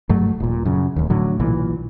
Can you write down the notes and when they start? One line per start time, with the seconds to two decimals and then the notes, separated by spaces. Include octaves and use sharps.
0.09 G2 F#3 A3
0.40 D#1 A#2
0.65 F#2 C#3
0.96 D1 D#2
1.10 A2 D3 F#3
1.40 B1 A#2 E3